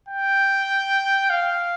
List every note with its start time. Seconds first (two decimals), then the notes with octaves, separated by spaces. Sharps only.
0.08 G5
1.30 F5